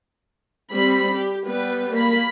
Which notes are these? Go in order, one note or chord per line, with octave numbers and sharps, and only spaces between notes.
G3 C4 B5
G4
G3 B3 B4
A#3 B5